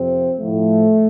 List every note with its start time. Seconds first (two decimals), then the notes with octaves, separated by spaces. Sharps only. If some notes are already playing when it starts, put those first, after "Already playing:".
Already playing: F2 C3 F3 C4
0.40 A2 F3 A3